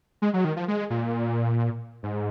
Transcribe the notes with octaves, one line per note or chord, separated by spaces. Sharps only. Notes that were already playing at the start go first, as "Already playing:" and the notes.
G#3
F#3
D#3
F3
G#3
A#2
G#2